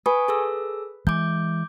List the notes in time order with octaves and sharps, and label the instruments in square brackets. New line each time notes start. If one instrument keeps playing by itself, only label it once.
[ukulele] B4 [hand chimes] G#5 C#6 D#6
[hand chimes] G#4 A4 E6
[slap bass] E3 G#3 [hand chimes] D6 G6